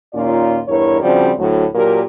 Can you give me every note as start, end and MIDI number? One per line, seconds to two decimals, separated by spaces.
0.14 0.61 39
0.14 0.61 46
0.14 0.61 61
0.14 0.61 63
0.14 0.61 65
0.14 0.61 74
0.69 1.00 40
0.69 1.00 43
0.69 1.00 64
0.69 1.00 70
0.69 1.00 73
1.02 1.31 49
1.02 1.31 53
1.02 1.31 55
1.02 1.31 60
1.02 1.31 62
1.02 1.31 66
1.38 1.64 38
1.38 1.64 45
1.38 1.64 54
1.74 2.01 46
1.74 2.01 54
1.74 2.01 62
1.74 2.01 67
1.74 2.01 70